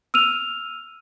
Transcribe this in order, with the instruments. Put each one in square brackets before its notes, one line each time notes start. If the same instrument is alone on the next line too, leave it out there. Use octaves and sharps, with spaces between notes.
[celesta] E6 F6 D#7 F7